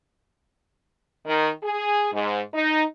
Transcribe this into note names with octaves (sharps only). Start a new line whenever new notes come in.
D#3
G#4
G#2
D#4